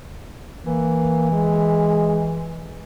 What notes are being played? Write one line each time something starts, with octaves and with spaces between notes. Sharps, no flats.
E3 A#3
G#3